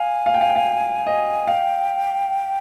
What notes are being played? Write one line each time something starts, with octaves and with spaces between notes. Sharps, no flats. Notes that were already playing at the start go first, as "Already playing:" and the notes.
Already playing: F5 G#5
F5
G5
F5
G5
F5
D#5
F5 G5